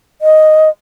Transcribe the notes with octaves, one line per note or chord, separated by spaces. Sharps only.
D#5